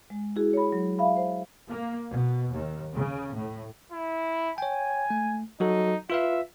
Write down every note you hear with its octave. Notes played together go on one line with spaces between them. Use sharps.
G#3
E4 F#4 G#4
C#5 B5
F#3
E5 F5 B5
C5
A#3
B2
D#2
C#3
A2
E4
C#5 G5 G#5
A3
F#3 D#4 F#4 A4
F4 B4 E5 F5